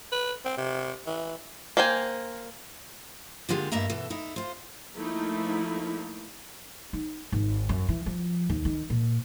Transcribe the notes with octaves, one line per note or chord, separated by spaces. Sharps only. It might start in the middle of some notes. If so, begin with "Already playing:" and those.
B4
C4
C3
E3
A#3 C5 G5 G#5
A#2 D3 G#3 F4 G4 G#4
G2 A#3 D#5 E5 A#5
B2 E3 A4
D#4 E4
F4 C5
F3 A3 A#3 D#4 E4
D#4
G#1
F#2
E3
F3
D#2
D#3
A#2